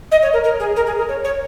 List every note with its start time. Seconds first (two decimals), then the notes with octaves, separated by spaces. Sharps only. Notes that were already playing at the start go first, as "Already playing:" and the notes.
0.11 D#5
0.22 C#5
0.33 A#4
0.44 A#4
0.60 G#4
0.76 A#4
0.87 G#4
0.97 A#4
1.09 C#5
1.24 C#5